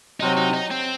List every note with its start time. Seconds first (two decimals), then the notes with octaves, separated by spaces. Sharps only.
0.20 C3 F#3 C4 D#4 F#4
0.37 D#4
0.53 D#4
0.71 C4